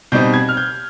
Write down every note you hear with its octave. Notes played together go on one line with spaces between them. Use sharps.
B2 G3 C4 D#4 G6
G#6
F6
G6